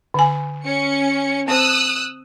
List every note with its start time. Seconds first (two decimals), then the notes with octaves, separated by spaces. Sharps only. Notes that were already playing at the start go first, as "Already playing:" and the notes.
0.14 D3 G#5
0.64 C#4 C#7
1.48 C4 C5 D#6 E6 F#6